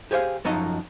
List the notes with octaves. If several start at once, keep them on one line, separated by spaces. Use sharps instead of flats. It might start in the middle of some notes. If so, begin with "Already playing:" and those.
G4 G#4 C5 C#5 F5
F#2 F3 F#3 D#4 D#5